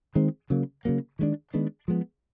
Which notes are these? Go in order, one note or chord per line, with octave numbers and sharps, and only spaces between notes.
D#3 G#3 C4
C#3 F#3 A#3
C#3 F#3 A#3
D#3 G#3 B3 D4
D#3 G#3 B3 D4
F3 G#3 B3